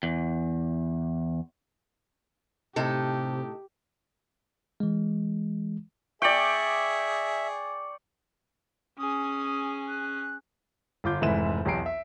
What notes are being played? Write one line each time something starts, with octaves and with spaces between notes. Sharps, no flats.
E2
A2 C3 D#4 G4 A4
E3 G#3
G#4 D5 E5 G5 C#6 C#7 F#7
C#4 G#4 D#6
F#6
G1 F4 D6 G6
F1 G#2 E3 B4 E5 E7
B1 E2 G4 A#5 C7 D7
E5